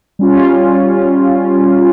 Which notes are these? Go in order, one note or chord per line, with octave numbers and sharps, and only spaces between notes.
G3 C#4 F4